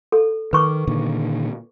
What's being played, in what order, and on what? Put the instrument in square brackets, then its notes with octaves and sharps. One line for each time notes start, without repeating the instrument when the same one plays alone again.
[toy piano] A4
[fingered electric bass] D#3 [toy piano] B4 C#6 D6
[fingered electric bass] A#2 D3 D#3